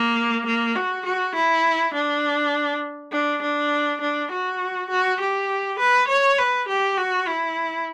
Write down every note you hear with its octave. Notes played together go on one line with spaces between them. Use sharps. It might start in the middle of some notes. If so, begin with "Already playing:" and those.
Already playing: A#3
A#3
F#4
F#4
E4
D4
D4
D4
D4
F#4
F#4
G4
B4
C#5
B4
G4
F#4
E4